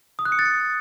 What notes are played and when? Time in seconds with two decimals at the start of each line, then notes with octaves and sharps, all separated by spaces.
0.19 D#6
0.25 F#6
0.32 C#7
0.39 A6
0.45 C#7